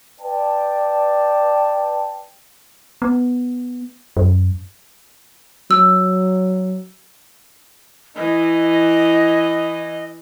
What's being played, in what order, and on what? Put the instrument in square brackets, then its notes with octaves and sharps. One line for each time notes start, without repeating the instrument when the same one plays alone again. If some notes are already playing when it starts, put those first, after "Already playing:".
[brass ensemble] B4 D5 G5 A5
[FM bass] B3
F#2
[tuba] F#3 [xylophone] E6
[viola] E3 E4 [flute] D#5